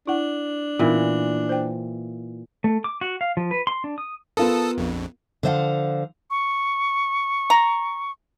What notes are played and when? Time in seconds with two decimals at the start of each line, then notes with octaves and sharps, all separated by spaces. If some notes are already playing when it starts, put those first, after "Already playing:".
0.07 D4 E4 F#5
0.79 A#2 E3 B3 D#4 A#4
1.49 C5 G5
2.64 A3
2.84 D6
3.01 F#4
3.21 F5
3.37 F3
3.51 B4
3.67 C6
3.84 D4
3.98 D#6
4.37 B3 F4 A4 A#4 A5 D#6
4.78 A#1 F2
5.43 D3 F3 C5 D#5 F5 F#5
6.30 C#6
7.50 A#5